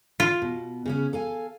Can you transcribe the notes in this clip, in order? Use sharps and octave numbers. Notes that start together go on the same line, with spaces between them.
F4
B2
C#3 B3 C#4
A4 F5 G#5